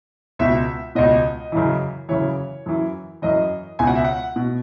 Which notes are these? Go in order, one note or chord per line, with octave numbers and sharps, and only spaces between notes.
C#2 B2 E5
C#2 B2 D#5
F#2 C#3 E3
F#2 C#3 E3 C#5
F#2 E3
F#2 E3 D#5
C#2 B2 G#5
F#5
E5
F#5
B2